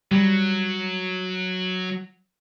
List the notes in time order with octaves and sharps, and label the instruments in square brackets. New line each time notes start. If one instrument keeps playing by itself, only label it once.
[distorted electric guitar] F#3 [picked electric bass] G3